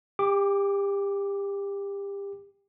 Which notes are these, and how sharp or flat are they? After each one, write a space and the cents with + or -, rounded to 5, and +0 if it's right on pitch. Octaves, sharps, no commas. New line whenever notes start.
G4 +30 D6 +0